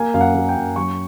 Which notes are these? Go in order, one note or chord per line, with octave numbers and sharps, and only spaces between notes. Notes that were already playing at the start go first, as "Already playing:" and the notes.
Already playing: A#3 G#5
F#2 F5
F#5
A#3
G5
F#2
F#3 C#6